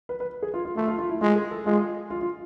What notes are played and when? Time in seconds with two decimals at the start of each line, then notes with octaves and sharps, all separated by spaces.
0.09 B4
0.20 B4
0.43 G#4
0.54 F4
0.65 F4
0.76 A3 F4
0.88 F4
0.98 F4
1.09 E4
1.21 G#3 F4
1.36 G#4
1.51 A4
1.65 G#3 F4
2.10 F4
2.21 F4